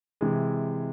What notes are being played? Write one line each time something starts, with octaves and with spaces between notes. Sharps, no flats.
C3 E3 G#3